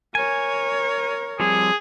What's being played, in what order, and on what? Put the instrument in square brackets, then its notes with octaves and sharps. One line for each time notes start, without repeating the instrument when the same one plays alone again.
[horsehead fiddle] A#4 C#5 [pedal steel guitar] G#5
[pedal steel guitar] F3 G3 C4 [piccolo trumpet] G#4